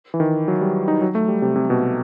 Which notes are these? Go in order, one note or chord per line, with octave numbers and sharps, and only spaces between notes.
E3
D#3
F#3
G3
D#4
F#3
A3
G3
C3
C3
B2